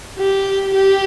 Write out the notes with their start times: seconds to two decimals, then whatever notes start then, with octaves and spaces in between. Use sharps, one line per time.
0.18 G4
0.74 G4